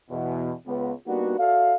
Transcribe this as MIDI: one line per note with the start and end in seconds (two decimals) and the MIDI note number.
0.11 0.52 40
0.11 0.52 47
0.67 0.92 37
0.67 0.92 59
1.08 1.37 55
1.08 1.37 58
1.08 1.37 59
1.08 1.37 62
1.08 1.37 63
1.08 1.37 66
1.39 1.75 66
1.39 1.75 69
1.39 1.75 74
1.39 1.75 76
1.39 1.75 77